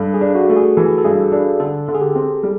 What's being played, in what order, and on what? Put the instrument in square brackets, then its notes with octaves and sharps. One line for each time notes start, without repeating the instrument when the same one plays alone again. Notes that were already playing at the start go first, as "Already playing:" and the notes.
Already playing: [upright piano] G2 [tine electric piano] A4
[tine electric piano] G#4
[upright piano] D4
[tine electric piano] F#4
[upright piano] A3
[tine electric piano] G#4
[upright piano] E3 [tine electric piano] A4
[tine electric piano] A4
[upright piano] G2 [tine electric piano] G#4
[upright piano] D4 [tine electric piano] A4
[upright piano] D3 [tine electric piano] A4
[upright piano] D3
[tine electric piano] G#4
G4
[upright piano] C4
G3